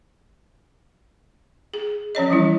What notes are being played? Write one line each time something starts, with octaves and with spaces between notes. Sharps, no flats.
G#4
F3 C#4 C#5 D#5
E3 G3 C#4 E4